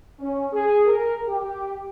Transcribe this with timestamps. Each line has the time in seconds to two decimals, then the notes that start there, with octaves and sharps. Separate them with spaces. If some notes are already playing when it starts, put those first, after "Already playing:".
0.18 C#4
0.53 G#4
0.85 A#4
1.27 G4